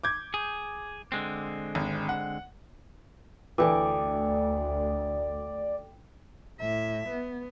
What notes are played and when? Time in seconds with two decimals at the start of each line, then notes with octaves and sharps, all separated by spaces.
0.03 D6 G6 G#6
0.34 G#4
1.12 D3 G#3 C4
1.75 G#1
2.09 F#5
3.58 D2 E3 A4 D5 G5 D6
6.61 A2 E5
7.09 B3